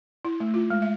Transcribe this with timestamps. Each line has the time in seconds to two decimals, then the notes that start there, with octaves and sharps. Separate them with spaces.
0.25 E4
0.40 A3
0.54 F4
0.70 G#3
0.82 E5